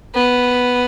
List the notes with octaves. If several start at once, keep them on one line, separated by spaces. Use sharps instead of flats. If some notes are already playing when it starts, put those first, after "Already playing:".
B3